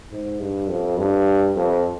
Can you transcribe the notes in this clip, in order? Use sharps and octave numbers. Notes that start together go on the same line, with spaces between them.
G#2
G2
F2
G2
F2